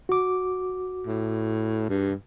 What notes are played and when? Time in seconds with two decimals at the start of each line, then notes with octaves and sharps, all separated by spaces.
0.09 F#4 D6
1.07 A2
1.89 G2